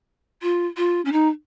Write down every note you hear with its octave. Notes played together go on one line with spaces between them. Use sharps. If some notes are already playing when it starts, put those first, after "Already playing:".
F4
F4
C#4
D#4